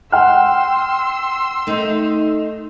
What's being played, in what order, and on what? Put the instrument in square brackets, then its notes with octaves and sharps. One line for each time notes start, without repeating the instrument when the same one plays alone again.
[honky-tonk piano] F#5 G5 F6 [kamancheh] C6 E6
[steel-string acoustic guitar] A3 D#4